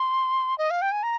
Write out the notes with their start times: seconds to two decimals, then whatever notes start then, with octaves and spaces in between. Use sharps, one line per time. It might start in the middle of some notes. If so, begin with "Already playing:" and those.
Already playing: C6
0.58 D#5
0.71 F5
0.82 G5
0.92 G#5
1.03 A#5